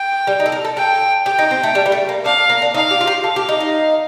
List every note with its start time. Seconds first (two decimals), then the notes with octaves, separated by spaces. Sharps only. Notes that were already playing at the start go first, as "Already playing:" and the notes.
Already playing: G5
0.27 G3
0.40 D#4
0.46 A4
0.52 A#4
0.65 A4
0.77 A4 G5
1.26 G4 G5
1.39 D#4
1.51 C4
1.63 A3
1.75 G3
1.86 G3
1.92 A3
2.09 A#3
2.25 D4 F5
2.50 A#3
2.62 D4
2.74 D#4 F5
2.91 G4
3.01 F4
3.07 G4
3.24 A4 F5
3.36 G4
3.49 D#4
3.61 D#4